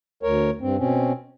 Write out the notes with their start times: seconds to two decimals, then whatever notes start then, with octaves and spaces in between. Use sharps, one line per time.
0.23 D2 A#4 C#5
0.61 G2 C4
0.78 B2 C4 C#4